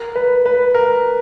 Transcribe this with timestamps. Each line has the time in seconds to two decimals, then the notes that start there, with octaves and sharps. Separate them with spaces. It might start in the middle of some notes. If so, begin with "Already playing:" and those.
Already playing: A#4
0.15 B4
0.46 B4
0.74 A#4